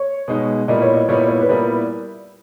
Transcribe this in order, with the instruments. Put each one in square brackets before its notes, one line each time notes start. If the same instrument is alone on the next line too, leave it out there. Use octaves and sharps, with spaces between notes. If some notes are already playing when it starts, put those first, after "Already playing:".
Already playing: [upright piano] C#5
[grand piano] B2 G#3 D#4
[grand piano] A#2 G3 B3 E4 A#4 [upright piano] D#5
[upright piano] C#5
D#5
[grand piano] A#2 G3 B3 E4 A#4 [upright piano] C#5
[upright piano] C#5
B4
[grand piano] A#2 G3 B3 E4 A#4